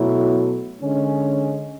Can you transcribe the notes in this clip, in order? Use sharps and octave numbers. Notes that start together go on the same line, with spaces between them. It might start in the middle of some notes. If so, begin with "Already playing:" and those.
Already playing: B2 F#3 A3 E4
D3 G#3 C#4